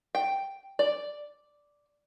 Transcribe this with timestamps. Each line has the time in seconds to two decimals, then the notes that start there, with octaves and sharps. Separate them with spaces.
0.15 G5
0.79 D5